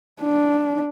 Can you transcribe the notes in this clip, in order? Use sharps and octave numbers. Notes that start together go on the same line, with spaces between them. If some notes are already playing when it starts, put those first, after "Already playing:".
D4